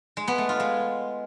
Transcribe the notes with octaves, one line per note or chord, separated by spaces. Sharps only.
G#3
B3
A3
F4
G#3